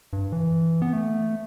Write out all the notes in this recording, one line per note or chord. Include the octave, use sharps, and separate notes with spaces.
G2
E3
B3
A3